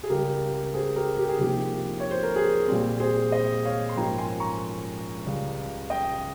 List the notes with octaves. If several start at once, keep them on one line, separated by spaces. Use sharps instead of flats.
G#4
C#2 C#3 G3 G4 A#4
G#4 C5
G4 A#4
G4
G#4
C2 C3 F3 A#3 D#4 G4
C#5
C5
A#4
G#4
A#2 G3 C4
G#4 C5
C5 D#5
C#5 F5
C6
G#2 F3 A#3 C#4 G5 A#5
G#5 C6
A#5 C#6
C#2 C#3 G3
D#5 G5